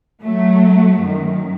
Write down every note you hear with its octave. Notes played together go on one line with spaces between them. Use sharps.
F#3 A3
F#2 D#3